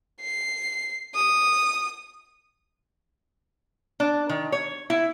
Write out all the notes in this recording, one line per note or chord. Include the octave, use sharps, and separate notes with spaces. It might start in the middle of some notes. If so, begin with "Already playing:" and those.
C7
D#6
D4
D#3
C#5
E4